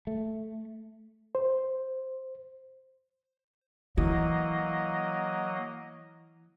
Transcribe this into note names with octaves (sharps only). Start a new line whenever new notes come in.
A3
C5
E3 F#3 A#3 D#5